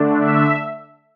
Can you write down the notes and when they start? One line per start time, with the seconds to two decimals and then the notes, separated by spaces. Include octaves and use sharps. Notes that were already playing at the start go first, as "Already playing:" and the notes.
Already playing: D3 A3 D4
0.20 E5